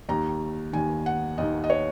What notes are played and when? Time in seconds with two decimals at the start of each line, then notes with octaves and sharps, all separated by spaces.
0.09 D#2 D#3 A#5
0.73 D#2 D#3 G#5
1.06 F#5
1.38 D#2 D#3 D#5
1.64 D#5
1.70 C#5